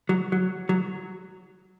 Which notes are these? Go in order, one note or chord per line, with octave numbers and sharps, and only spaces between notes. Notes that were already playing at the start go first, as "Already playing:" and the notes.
F#3
F#3
F#3